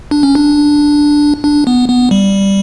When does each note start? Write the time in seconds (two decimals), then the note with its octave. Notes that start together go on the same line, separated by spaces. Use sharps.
0.11 D4
0.23 C#4
0.35 D4
1.44 D4
1.67 B3
1.89 B3
2.11 G3